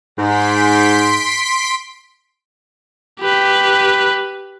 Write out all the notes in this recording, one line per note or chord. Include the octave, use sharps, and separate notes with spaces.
G#2 C6 B6 D7
G4 B4